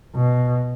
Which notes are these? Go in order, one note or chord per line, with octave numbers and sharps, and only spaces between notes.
B2